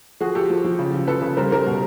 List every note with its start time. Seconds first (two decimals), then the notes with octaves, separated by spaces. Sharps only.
0.20 F3 F#4 G#4
0.35 F3 G4 A4
0.50 F3
0.64 F3
0.79 C#3
0.94 F3
1.07 F3 A4 B4
1.22 C#3
1.37 G3 A#4 C5
1.51 G3 A#4 C5
1.66 B2